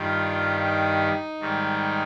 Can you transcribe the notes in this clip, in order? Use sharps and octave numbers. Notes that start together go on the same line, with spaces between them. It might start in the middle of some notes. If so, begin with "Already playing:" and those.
Already playing: G2 D#3 G3 F4
D#4
G#2 D#3 G3